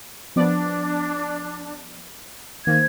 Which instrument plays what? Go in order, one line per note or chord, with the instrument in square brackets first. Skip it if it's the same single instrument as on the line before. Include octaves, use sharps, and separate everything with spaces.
[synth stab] F3 B3 D5 [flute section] D4
[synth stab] D#3 A#3 [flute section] C5 G#6